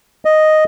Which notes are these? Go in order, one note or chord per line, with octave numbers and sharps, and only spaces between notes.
D#5